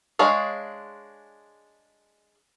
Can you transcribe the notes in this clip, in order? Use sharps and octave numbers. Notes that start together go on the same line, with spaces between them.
G#3 D4 G#4 C#5 F5